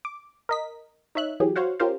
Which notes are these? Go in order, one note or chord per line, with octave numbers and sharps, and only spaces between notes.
D6
A#4 D#5 B6
D#4 C#5 E5 F#6
E3 F#3 G4 G#4
F#4 C5 C#5 F5 F#5
C#4 F4 G4 A#4 C5 F5